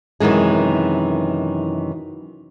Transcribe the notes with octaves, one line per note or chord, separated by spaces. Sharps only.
F#2 C3 D#3 E3 G#3